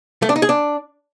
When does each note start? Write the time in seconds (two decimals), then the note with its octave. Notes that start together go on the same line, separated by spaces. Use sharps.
0.22 A3
0.29 D4
0.36 D#4
0.42 G#4
0.49 D4